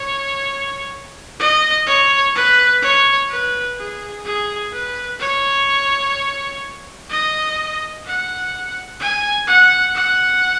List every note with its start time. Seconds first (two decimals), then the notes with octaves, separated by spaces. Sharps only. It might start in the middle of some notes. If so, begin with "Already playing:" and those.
Already playing: C#5
1.40 D#5
1.87 C#5
2.35 B4
2.82 C#5
3.30 B4
3.78 G#4
4.26 G#4
4.73 B4
5.21 C#5
7.10 D#5
8.05 F#5
9.00 G#5
9.48 F#5
9.95 F#5